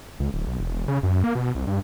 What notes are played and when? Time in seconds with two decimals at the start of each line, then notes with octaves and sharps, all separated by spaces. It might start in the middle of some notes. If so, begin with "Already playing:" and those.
0.20 C#2
0.34 D1
0.47 B1
0.60 E1
0.88 C#3
1.03 F#2
1.24 A#3
1.35 B2
1.55 C2
1.67 G2